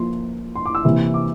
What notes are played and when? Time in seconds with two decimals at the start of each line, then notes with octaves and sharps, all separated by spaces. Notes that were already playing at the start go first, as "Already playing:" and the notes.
Already playing: F3 A#3 F4 C6
0.56 C6
0.66 D6
0.75 E6
0.84 C3 E3 A#3 E4
1.14 D6